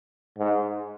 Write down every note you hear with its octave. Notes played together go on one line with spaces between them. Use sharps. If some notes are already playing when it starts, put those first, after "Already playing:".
G#2